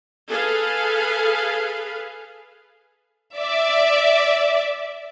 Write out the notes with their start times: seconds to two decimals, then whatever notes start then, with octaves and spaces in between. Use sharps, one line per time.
0.28 G#4 A4 B4 F5
3.38 D5 E5